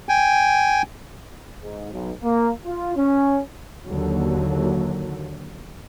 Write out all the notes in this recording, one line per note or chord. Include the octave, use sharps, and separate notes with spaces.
G5 G#5
G#2
B1
A#3
F4
C#4
D#2 D3 F#3